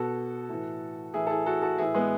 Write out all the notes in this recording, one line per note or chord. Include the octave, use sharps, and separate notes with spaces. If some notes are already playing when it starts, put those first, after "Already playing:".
Already playing: B2 F#4 A4
A2 E3
A2 E3 E4 G#4
A4
E4 G#4
F#4 A4
F#4 A4
A2 E3 E4 G#4
G#3 B3